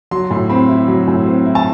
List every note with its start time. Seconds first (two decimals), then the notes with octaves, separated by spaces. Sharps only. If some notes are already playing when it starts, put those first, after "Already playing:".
0.11 F#3 C6
0.31 A2
0.50 C4 B5
0.69 E4
0.88 F#3
1.08 A2
1.26 C4
1.46 E4
1.55 A5